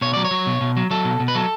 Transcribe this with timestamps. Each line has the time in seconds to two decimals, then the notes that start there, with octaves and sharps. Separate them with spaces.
0.01 B2 C#5
0.14 F#3 D5
0.25 C#5
0.31 F#3
0.47 B2
0.61 B2
0.77 F#3
0.90 F#3 A4
1.05 B2
1.20 B2
1.28 B4
1.35 F#3 A4